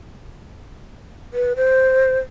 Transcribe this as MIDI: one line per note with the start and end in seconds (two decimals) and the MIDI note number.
1.33 1.53 71
1.56 2.19 72